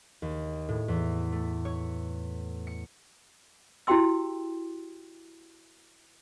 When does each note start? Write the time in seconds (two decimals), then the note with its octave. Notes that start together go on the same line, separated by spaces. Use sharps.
0.22 D#2
0.69 A2
0.88 E2
1.32 A3
1.65 C#5
2.67 C#7
3.87 E4 F#4 G4 G5 C6 E6